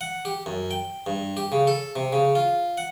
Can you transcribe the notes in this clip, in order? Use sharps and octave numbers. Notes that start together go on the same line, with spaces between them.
F#5
G4
F#2
G5
G2
G4
C#3
A4
C3
C#3
F4
F#5